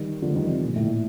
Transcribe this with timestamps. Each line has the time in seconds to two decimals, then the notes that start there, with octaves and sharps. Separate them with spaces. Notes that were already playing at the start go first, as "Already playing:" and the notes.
Already playing: D#3 G3
0.22 D3 F3
0.29 A3
0.36 D#3 G3
0.48 C3 D#3
0.65 A#2
0.76 A2